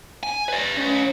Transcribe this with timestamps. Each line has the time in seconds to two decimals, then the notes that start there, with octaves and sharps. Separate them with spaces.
0.23 G#5
0.49 B4 D5
0.76 C#4 B4